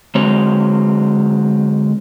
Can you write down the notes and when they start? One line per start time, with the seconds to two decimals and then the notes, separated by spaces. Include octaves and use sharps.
0.15 D3 F#3 G#3 C4 C#5